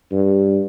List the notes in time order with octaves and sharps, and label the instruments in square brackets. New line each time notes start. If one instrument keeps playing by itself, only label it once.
[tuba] G2